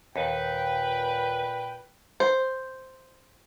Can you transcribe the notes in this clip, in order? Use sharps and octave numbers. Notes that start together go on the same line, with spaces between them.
D#2 A#2 B4 G5
C5